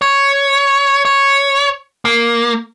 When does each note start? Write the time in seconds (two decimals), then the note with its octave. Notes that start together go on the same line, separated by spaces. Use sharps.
0.02 C#5
1.05 C#5
2.05 A#3